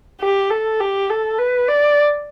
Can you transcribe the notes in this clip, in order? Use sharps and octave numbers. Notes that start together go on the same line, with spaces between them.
G4
A4
G4
A4
B4
D5